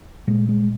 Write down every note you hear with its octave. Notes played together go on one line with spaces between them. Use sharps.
A#2 G#3
G#3